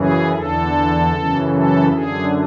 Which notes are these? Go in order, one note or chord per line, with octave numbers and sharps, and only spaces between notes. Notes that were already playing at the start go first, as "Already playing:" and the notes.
Already playing: F#2 C#3 E3 G#4
E2 D3 A4
F#2 C#3 E3
A4
F#2 D3 G#4